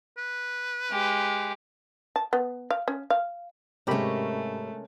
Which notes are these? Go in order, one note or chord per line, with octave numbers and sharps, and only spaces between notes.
B4
G#3 G4
A5
B3
F5
C#4
F5
G#2 C3 G#3 A3 C#4 G4 A#4 B5